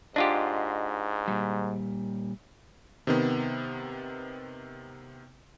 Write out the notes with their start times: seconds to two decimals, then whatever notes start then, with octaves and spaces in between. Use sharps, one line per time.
0.16 G#2 D4 F4 G4 D#5 F#5
1.28 A#2 G3
3.07 C3 D#3 B3